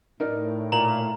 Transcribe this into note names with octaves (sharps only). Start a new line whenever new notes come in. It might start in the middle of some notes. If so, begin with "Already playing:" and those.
A2 D#4 A#4 D5
A#2 A#5 F#7